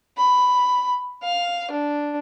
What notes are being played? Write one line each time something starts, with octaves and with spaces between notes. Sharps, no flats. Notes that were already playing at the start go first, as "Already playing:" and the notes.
B5
F5
D4